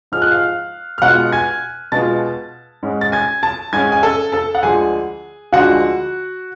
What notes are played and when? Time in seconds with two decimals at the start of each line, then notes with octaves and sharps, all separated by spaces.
0.12 G#2 F3 G#3 F6
0.22 F#6
0.31 F5 F6
0.98 F6
1.02 B2 G#3 B3 F4 F#5 F#6
1.32 G#5 G#6
1.92 B2 G#3 B3 F4 A5 A6
2.83 G#2 G#3 C#4
3.01 A6
3.12 G#5 G#6
3.43 A5 A6
3.73 G#2 G#3 C#4 G#5 G#6
3.92 G#5
4.03 A4 A5
4.32 A4 A5
4.55 F#5
4.62 D2 D3 F3 G#3 D4 G#4 G#5
5.52 D2 D3 F3 G#3 D4 F#4 F#5